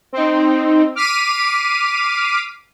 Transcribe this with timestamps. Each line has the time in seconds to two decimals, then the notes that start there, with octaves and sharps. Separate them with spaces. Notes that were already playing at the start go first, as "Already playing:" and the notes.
0.13 C4 D#4
0.95 D6 F6 B6 C7 D#7